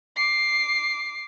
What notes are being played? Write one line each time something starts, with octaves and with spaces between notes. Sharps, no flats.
D6 C7